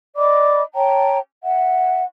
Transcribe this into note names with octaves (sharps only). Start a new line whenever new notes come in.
D5 D#5 B5 D6
C#5 G5 A5 A#5
E5 F#5